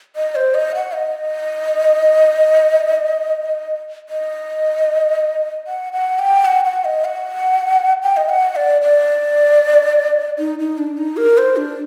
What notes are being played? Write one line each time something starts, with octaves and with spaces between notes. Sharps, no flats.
D#5
C5
D#5
F#5
D#5
D#5
F#5
F#5
G5
F#5
F#5
D#5
F#5
G5
D#5
F#5
D5
D5
D#4
D#4
D4
D#4
A#4
C5
D4